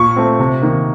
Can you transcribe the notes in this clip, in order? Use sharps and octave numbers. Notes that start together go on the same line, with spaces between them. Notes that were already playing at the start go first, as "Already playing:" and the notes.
Already playing: A#2 C#6
A3 C4
C3
D#3 A#3